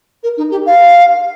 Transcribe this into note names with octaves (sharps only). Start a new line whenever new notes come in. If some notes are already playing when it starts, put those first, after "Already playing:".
A#4
D#4
G4
F5